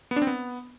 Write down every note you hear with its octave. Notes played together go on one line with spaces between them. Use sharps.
B3
D4
C4
B3